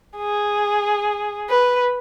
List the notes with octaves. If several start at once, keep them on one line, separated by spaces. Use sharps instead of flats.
G#4
B4